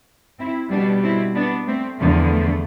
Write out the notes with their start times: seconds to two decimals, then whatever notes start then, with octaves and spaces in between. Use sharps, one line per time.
0.39 C4 E4
0.71 B2 G3 B3 D4
1.03 C4 E4
1.35 B3 D4
1.67 A3 C4
1.99 E2 D3 F3 A3
2.31 A3